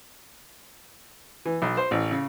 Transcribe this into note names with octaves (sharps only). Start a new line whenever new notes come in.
E3
B1
C5
A1
C#3